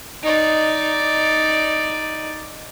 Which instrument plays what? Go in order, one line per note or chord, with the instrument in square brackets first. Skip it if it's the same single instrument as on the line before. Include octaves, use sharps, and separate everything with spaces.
[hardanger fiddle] D#4 D5